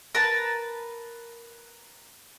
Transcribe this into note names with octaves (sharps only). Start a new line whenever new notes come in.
A#4 B4 A5